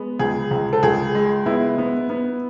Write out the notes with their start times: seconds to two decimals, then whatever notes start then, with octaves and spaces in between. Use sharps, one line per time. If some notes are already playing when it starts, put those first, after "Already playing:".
Already playing: G#3 B3
0.19 C#2 G#4
0.51 C#2
0.73 A4
0.83 C#2 G#4
1.15 G#3
1.46 B3 E4
1.78 B3
2.10 B3